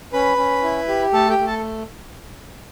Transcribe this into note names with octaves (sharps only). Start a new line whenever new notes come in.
C#4 B4 B5
C#4
E4
G4
A3 A4 A5
G4 G5
A3
A4 A5